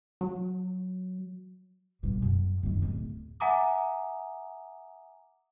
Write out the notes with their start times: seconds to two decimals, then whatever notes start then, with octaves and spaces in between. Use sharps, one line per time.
0.21 F#3
2.03 G2 B2
2.22 F#2
2.63 F#2 D#3
2.82 D1
3.40 E5 F#5 G#5 A#5 D6 D#6